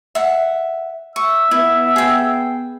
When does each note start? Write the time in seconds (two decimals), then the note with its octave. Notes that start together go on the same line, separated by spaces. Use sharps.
0.15 E5 F#5
1.16 E5 C#6
1.51 B3 E4
1.96 G#4 G5